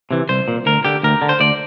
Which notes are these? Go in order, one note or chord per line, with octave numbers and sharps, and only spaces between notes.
C3 E3
C2 C5
A#2
D2 A#4
D3 G4
D2 A#4
D3
C5
D2 D5